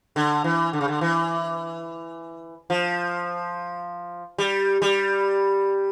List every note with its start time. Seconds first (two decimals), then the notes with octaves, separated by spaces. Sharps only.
0.16 D3
0.44 E3
0.73 D3
0.81 C#3
0.88 D3
1.01 E3
2.70 F3
4.38 G3
4.82 G3